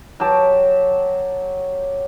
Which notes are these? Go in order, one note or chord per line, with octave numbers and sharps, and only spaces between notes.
F#3 G4 A5